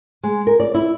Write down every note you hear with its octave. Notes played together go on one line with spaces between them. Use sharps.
G#3
A#4
D5
E4